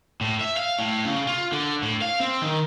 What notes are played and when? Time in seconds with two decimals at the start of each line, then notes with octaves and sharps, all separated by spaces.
0.21 A2
0.41 E5
0.57 F5
0.79 A2
1.05 C#3
1.27 F4
1.52 D3
1.82 A2
2.02 F5
2.20 C4
2.42 D#3